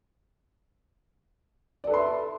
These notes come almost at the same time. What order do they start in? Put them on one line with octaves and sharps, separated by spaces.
D5 A4 B4 C6 E5